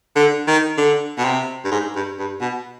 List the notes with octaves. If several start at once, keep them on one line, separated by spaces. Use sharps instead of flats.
D3
D#3
D3
B2
C3
G2
G#2
G2
G2
B2